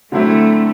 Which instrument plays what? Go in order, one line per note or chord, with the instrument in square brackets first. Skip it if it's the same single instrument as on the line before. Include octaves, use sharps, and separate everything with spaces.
[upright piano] D3 F#3 C4 E4 [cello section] A3